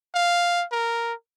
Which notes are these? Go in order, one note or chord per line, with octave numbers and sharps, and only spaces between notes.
F5
A#4